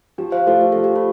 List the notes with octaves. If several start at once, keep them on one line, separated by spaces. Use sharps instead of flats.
F3 G4
C5 F5
A3 F4 G4 C5 D5
C5
F3 A4
G4
F4 A4